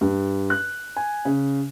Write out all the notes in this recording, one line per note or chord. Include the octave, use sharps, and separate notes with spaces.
G2
F#6
G#5
C#3